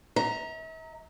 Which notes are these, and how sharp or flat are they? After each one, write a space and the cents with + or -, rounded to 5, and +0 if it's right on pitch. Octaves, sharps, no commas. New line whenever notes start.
E5 -45 A#5 -5